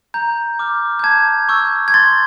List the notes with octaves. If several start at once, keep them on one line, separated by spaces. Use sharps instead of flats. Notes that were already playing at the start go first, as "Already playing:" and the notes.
A#5 G6
D6 F6
G6
A5 G#6
C#6 E6 G6
G#6
C6 A6